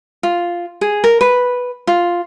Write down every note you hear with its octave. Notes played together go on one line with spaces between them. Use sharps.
F4
G#4
A#4
B4
F4